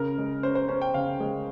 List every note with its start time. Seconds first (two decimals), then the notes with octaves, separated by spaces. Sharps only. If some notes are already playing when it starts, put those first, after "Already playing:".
Already playing: C#3 A#4
0.18 G#3
0.43 C#4 C5
0.55 C5
0.68 C#4 C5
0.82 G5
0.94 C#3 F5
1.20 G#3